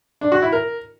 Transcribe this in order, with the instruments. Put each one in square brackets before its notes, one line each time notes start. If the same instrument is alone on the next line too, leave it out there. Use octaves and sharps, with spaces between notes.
[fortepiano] D4
F#4
E4
A#4